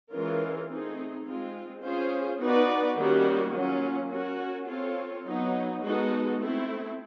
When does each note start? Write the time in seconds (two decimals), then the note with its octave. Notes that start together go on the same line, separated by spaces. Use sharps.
0.12 E3 G#3 C#4 F4 A#4
0.68 A3 C4 D#4 G#4
1.25 G#3 C4 F4
1.83 C#4 F4 G#4 C5
2.40 B3 D#4 F#4 B4 D5
2.97 D#3 G3 A#3 C#4 F#4
3.54 F#3 A#3 C#4 F4
4.11 C#4 F#4 A#4 C#5
4.68 C4 F4 A4 C#5
5.25 F#3 B3 D#4
5.83 G#3 B3 D#4 F#4 A4
6.40 A3 C4 E4